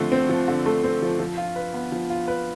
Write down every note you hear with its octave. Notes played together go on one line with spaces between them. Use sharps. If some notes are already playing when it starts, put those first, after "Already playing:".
Already playing: D3 F3 A3 C4
C4
F3
D3
A3
C4
F3
F3
F4
B4
B3
F3
F4
B4